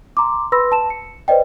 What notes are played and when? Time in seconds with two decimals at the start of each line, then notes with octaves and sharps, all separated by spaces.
0.17 A#5 C6 D6
0.52 B4 B5 C6 E6 A#6
0.72 A5 E7
0.90 C#7
1.28 B4 C5 D5 D#5 G5